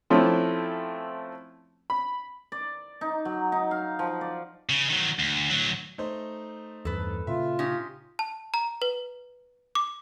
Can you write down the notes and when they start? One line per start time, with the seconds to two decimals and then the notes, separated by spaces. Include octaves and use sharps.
0.10 F3 A3 C4 C#4 E4
1.90 B5
2.52 D5
3.01 D#4
3.25 F#3
3.52 D#4
3.71 F5
3.99 F3
4.21 D5
4.69 C#3
4.89 D#3 F#3
5.19 D2
5.50 D2 F#3
5.98 A3 D#4 C5
6.85 E2 G2 A4 B4
7.27 A#2 C#3 F4 E5
7.59 C#4 D#4 G4
8.19 A5
8.54 A#5
8.82 B4
9.75 D6